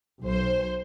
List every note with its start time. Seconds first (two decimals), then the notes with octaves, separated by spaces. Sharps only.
0.22 B1 C5